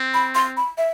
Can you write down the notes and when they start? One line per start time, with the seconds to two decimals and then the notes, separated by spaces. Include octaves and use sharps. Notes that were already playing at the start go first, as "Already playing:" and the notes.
Already playing: C4
0.14 B5
0.35 C6
0.57 B5
0.78 E5